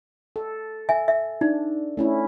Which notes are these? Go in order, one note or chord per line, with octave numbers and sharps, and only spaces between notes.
A4
E5 G#5
E5
D4 D#4
A3 C#4 E4